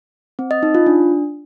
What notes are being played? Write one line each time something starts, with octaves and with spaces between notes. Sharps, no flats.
C4
D#5
D#4
F4
D4